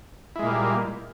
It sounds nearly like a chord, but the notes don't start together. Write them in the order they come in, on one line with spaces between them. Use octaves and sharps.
E4 G#3 A#2 A#3 G3